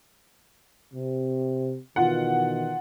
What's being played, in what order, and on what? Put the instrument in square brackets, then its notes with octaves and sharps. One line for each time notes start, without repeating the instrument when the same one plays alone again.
[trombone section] C3
[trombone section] B2 D#3 E3 [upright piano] F4 F#5